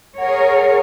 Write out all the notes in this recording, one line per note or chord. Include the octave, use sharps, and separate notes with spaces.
G#4 A#4 C#5 F#5